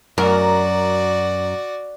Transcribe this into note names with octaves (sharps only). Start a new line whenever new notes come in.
F#2 F#4 A#4 D5